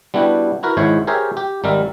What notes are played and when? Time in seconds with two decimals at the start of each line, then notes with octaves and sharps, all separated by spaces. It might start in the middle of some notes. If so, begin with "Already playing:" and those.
0.14 G3 B3 D4 E4 F#4 G4
0.63 E4 F#4 A#4 B4
0.77 G#1 G#2 E4 C5 C#5
1.07 G4 G#4 A#4 C5 C#5 E5
1.37 G4
1.64 G#1 G3 A#4 E5